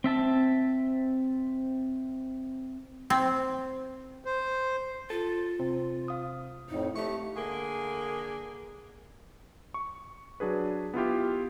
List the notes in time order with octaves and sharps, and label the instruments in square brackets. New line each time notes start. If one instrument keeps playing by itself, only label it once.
[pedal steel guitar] C4 E5 A5 E6
[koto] C4
[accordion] C5
[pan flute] F4 [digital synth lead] A4
[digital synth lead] C3
[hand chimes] F5 D#6
[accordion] F2 A2 [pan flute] D#4
[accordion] A3 [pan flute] G4 [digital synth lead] C#6
[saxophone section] D3 A#3 G#4
[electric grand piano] C#6
F#3 D4 G#4 B4
B3 E4 F4 G4